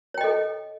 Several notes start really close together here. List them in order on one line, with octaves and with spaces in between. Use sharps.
C#5 G5 D#5 A4